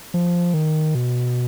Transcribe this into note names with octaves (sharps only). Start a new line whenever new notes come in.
F3
D#3
B2